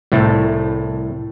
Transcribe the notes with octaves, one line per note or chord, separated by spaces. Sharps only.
C2 A2 A3